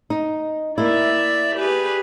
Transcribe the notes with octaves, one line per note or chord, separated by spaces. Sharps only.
D#4
A#3 E4 D5 E5
G4 G#4 B4